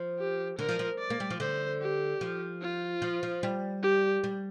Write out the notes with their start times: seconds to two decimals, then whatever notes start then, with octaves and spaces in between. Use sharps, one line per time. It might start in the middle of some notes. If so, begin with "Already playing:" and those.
Already playing: F3
0.19 G4
0.59 D3 A#4
0.69 F3
0.79 F3
0.99 D5
1.10 A#3
1.20 G3
1.30 F3
1.40 D3 C5
1.81 G4
2.21 F3
2.62 F4
3.02 F3
3.23 F3
3.43 G3
3.83 G4
4.24 G3